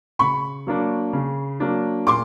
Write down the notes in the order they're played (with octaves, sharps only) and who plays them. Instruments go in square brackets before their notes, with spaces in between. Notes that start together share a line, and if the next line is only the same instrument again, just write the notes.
[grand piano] C#3 [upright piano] B5 C#6
[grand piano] F#3 A#3 D4
C#3
F#3 A#3 D4
[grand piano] A#2 [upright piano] C6 D6